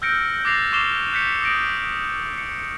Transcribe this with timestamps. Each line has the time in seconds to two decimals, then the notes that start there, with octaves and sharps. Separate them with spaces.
0.02 E6 F6 G6 A#6 C#7 D7
0.45 D6 F#6 A6 A#6 C7 F7
0.73 C#6 D6 C7 E7 F7 G7
1.13 F#6 G6 B6 C#7
1.42 D#6 A#6 D7
2.38 C#7